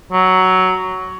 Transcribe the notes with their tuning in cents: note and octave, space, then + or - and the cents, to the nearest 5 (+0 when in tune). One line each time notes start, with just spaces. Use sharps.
F#3 +10